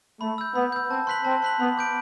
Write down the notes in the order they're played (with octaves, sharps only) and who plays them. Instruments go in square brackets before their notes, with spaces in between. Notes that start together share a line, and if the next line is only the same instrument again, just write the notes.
[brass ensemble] A3 [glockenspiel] B5
[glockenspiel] E6 G6
[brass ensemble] B3 [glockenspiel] B5
[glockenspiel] E6 G6
[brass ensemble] C4 [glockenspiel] A5
[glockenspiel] C6 F#6 B6 F#7
[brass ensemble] C4 [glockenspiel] A5
[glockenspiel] C6 F#6 B6 F#7
[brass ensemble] B3 [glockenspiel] B5
[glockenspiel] D6 G6 D7